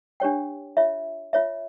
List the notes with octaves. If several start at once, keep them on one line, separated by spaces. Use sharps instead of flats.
D4 G4 C#5 G5
F4 C#5 E5
F4 C#5 E5